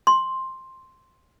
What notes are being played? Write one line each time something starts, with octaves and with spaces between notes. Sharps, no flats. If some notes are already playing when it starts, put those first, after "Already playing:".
C6